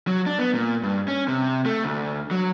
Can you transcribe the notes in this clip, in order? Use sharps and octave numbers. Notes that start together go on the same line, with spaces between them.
F#3
D4
B3
A#2
G2
C#4
C3
A3
D2
F#3